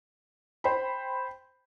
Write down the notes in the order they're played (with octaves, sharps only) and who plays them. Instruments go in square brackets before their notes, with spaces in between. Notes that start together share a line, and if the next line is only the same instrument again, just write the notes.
[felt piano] C5 G5 B5